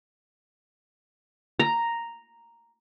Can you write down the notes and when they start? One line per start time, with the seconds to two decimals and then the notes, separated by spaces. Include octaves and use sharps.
1.59 A#5